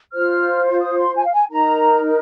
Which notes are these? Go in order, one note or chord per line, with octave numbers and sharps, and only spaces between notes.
F4 C5 F6
D#6
C6
G#5
F5
G#5
D#4 A#4 A#5